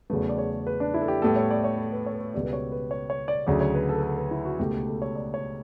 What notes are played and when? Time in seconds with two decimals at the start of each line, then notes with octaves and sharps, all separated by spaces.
0.10 E2 C#3 F#3 A3 B4
0.30 D5
0.38 C#5
0.67 B4
0.80 D4
0.94 E4
1.02 A4
1.08 G4
1.22 A2 G3 B3 A4
1.36 C#5
1.51 D5
1.64 C#5
1.78 A4
1.92 B4
2.06 C#5
2.13 B4
2.21 C#5
2.34 C#2 B2 G3 D5
2.44 B4
2.53 C#5
2.72 B4
2.91 C#5
3.10 C#5
3.28 D5
3.47 D2 C#3 F#3 D5
3.61 C#5
3.74 B4
3.89 A4
3.98 B4
4.03 A4
4.17 B4
4.31 E4
4.45 F#4
4.59 C#2 B2 A3 G4
4.87 A4
5.02 C#5
5.16 D5
5.34 C#5